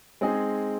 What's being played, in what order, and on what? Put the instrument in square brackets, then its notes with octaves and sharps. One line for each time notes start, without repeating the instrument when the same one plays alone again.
[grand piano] G#3 C4 D#4 G#4